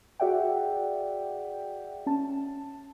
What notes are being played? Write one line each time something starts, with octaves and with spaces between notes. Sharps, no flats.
F#4 G#4 D5 E5 F#5 G5
C#4 A5